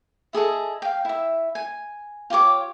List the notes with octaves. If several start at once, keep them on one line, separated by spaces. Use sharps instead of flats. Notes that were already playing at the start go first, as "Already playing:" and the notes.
E4 G#4 A4 D#5
F5 G5
E4 E5
G#5
F4 G4 C#5 D6